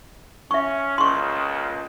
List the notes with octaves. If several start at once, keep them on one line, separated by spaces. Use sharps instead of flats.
C#4 E5 C#6
C#2 A#2 C#3 C6 C#6